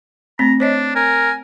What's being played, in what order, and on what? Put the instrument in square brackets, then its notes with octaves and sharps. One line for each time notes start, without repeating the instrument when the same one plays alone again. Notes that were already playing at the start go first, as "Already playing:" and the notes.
[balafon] A3 C4 [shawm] A#5
[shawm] D4 [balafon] C5 C#5 D#5
[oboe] A#4 [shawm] G#5